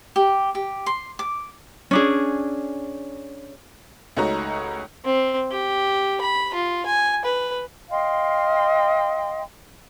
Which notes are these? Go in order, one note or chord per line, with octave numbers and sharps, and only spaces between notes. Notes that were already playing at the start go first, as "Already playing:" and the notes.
G4
G4
C6
D6
C#4 D4 G#4
C#2 A3 D#4 F#4 C#5 A#5
C4
G4
B5
F4
G#5
B4
D#5 F5 G5 C6